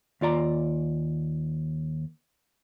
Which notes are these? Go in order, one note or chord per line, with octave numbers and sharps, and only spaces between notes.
D#2 F4 D5 A#5